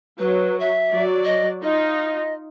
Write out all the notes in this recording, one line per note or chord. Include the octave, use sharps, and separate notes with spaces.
F#3 B4
E5
F#3 D5
D#5
D#4 F4 D#5